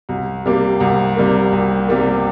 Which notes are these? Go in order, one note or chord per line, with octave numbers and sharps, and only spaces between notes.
C2
C3 G3 A#3
C2
C3 G3 A#3
C2
C3 G3 A#3